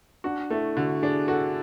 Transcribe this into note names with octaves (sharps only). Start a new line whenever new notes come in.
D4 F#4
A3 E4
D3 F#4
D4 G#4
F#4 A4